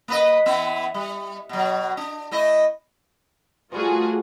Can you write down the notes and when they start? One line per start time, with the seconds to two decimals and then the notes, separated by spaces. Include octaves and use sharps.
0.08 A#3 B4 D#5
0.46 E3 B3 E5
0.94 G3
1.49 B2 F#3
1.97 D4
2.31 A3 E4 D#5
3.72 F3 G3 A3 F4 F#4 G#4